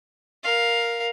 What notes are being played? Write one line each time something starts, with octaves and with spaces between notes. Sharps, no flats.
A#4 F5